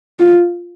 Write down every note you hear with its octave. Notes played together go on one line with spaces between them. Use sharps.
F4